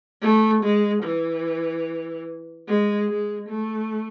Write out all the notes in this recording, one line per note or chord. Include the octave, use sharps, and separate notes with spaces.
A3
G#3
E3
G#3
G#3
A3